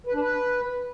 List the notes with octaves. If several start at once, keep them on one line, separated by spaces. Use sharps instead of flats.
B4
D4
B4